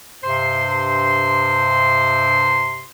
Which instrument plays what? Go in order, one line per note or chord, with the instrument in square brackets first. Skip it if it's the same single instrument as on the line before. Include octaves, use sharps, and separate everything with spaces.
[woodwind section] G2 C3 C5 C6